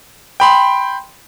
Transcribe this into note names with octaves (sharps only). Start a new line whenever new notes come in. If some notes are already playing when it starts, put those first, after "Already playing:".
G5 B5 C6